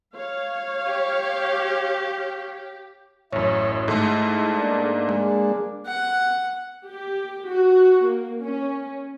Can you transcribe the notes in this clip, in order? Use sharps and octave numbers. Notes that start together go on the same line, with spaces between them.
C#5 F5
G4
A1 F#2 E4 C#5
G#2 A3 A4
A#3 D4
G#3
F#5
G4
F#4
A#3
C#4